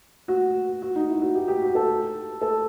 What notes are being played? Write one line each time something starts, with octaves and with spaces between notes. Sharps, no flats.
F#4
F#4
D#4
E4
F#4
G4
G4
F#4
A4
A4